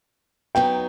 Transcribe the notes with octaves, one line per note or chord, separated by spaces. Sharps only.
F#3 B3 D#4 G5